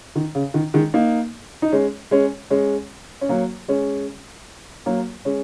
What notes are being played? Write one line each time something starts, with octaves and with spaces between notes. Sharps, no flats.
D#3
C#3
D#3
D#3 G#3
A#3 D#4
D#4
G#3 C#4
G#3 C#4
G#3 C#4
C#4
F#3 A#3
G#3 C#4
F#3 A#3
G#3 C#4